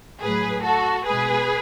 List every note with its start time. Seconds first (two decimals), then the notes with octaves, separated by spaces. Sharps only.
0.21 A2 F#3 G#4 B4
0.63 F#4 A4
1.05 B2 G#3 G#4 B4